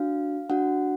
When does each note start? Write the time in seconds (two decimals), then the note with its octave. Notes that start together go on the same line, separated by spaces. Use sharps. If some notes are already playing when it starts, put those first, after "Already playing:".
Already playing: D4 F#4 F5
0.50 D4 F#4 F#5